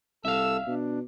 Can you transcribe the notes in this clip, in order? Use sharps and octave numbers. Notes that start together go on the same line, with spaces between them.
C2 A4 E5 F5 E6
B2 D4